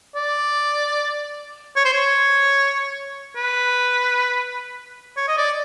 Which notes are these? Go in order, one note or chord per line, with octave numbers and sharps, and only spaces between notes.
D5
C#5
C5
C#5
B4
C#5
D#5
D5